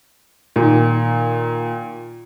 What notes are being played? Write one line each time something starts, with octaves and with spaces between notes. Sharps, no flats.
A#2 D#3